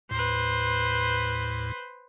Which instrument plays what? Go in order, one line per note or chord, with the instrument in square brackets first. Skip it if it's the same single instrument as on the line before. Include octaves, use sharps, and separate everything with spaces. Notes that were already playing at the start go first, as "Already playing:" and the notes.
[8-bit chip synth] D#2 A2 [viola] B4 C5